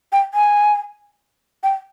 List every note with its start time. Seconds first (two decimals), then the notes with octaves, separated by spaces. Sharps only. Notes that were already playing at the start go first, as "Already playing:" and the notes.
0.12 G5
0.34 G#5
1.63 G5